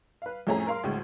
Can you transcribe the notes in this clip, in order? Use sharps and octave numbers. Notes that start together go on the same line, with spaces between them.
B4 F5
F2 A2 A3 C#4 G#4 A#5
A#4 F5 C6
D2 A2 G#3